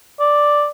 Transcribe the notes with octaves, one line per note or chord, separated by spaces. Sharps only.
D5